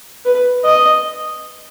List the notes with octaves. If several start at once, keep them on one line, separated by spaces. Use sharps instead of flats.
B4
D#5